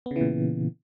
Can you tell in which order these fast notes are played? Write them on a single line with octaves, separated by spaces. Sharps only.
B3 C#3 E3 A#2